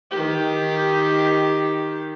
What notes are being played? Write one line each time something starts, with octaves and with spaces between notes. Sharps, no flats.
D#3 G4